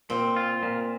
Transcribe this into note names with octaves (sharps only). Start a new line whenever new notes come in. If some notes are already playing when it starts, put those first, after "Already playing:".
A#2 C4
F4
A#2